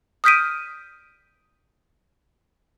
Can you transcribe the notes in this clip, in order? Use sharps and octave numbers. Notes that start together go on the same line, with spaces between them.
D#6 F6 G6 B6 D7 D#7